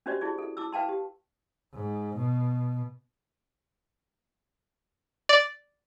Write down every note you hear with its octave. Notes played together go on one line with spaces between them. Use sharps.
C#4 D4 F#4 G4 C5 D5
E4 F#4 G#4 D5
A4
E4 D6 E6
B4 F5 G5 A5 C6
G4
G#2
B2
D5